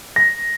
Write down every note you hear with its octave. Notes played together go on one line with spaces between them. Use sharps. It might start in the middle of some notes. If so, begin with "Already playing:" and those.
A#6